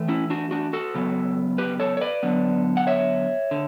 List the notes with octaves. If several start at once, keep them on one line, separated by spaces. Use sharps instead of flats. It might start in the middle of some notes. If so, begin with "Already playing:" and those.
Already playing: E3 A3
C#4 E4
D4 F#4
D4 F#4
F#4 A4
C#3 F#3 B3
G4 B4
A4 C#5
C#5
B4 D5
D3 F#3 B3
F#5
C#5 E5
D3